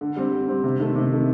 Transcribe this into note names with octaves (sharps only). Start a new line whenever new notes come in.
D3
G3 C4
D3
G3 C4
C3
D#3 A3
C3
D#3 A3